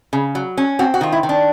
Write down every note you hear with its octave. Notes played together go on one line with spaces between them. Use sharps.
C#3
F#3
C#4
C4 F#4
F#4
D#3 F4
E4
D#3
D4